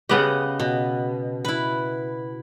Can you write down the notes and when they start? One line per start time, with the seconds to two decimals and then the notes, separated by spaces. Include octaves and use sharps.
0.09 C#3 B3 G4 D#5 F#5
0.60 B2
1.45 E4 B4